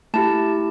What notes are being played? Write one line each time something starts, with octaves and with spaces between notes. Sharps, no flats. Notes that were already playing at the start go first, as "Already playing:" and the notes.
A3 E4 G4 A5